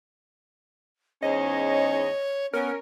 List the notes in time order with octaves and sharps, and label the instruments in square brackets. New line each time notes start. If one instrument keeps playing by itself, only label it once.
[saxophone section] E2 G#2 C#4 [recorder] C#5 [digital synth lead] D#5
[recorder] B3 [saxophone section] C#4 [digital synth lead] A#4